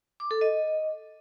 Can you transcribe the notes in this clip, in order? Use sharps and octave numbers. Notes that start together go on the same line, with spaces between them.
D6
A4
D#5